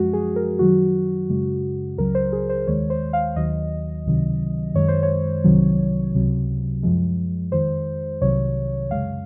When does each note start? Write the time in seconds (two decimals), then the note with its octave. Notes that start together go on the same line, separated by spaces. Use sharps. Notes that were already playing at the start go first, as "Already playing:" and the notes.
Already playing: F#2 F3 G#3 F#4
0.13 G#4
0.36 A#4
0.59 F#2 D#3 F#3 F#4
1.29 F#2 C#3 G#3
1.97 C#2 C#3 F#3 A#4
2.15 C5
2.32 G#4
2.50 C5
2.67 D#2 D#3 G#3 C#5
2.90 C5
3.13 F5
3.36 D#2 D#3 F#3 D#5
4.06 C#2 C3 D#3 F#3
4.74 F#2 D#3 G#3 C#5
4.88 C5
5.03 C#5
5.44 C2 C3 D#3 F#3
6.14 C#2 C3 F#3
6.83 F#2 F3 G#3
7.52 F2 D#3 G#3 C5
8.21 C2 C3 D#3 F#3 C#5
8.90 F#2 C#3 G#3 F5